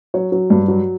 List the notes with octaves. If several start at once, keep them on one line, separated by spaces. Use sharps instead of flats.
F#3 C#5
F#3
G2
F#3